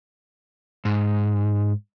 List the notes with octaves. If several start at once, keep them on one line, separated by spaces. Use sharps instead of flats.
G#2